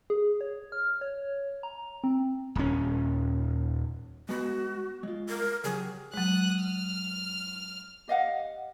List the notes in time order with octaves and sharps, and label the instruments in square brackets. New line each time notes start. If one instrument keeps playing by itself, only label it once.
[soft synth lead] G#4
C#5
F6
C#5
A#5
C4
[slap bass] D#1 C#4
[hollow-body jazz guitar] G#3 B3 B5 [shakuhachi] F#4
[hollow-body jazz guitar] G#3 F4
[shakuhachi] A#4
[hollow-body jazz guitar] C#3 F#3 G4 [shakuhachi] G#4
[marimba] F#3 G#3 [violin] D#6 F#6
[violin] F6
[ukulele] G4 D#5 F5 F#5